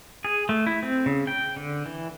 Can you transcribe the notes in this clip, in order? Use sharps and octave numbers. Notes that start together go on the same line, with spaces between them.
G#4
A3
E4
C4
C#3
G5
D3
E3